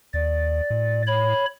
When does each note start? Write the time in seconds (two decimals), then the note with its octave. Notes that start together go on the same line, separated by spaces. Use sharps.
0.14 D#2 D5
0.70 A2
1.07 C#5 B5